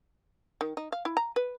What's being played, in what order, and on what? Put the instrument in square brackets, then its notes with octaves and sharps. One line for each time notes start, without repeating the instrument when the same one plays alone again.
[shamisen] D#3
D#4
F5
E4
A#5
B4